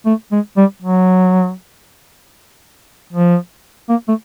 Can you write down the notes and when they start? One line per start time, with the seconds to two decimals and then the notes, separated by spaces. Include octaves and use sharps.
0.06 A3
0.31 G#3
0.57 G3
0.82 F#3
3.13 F3
3.89 A#3
4.08 A3